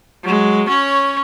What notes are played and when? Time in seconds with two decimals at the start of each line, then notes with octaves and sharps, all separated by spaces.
0.24 F#3 G#3
0.69 C#4 C#5